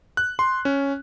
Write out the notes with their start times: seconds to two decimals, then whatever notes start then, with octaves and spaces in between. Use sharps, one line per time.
0.17 F#6
0.39 C6
0.65 C#4